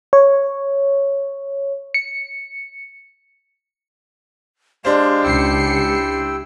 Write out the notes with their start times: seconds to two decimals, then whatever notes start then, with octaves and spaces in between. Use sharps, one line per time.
0.13 C#5
1.94 C#7
4.85 G#3 D4 G4 C5 F5
5.24 C#2 E4 G5 E6 C7 C#7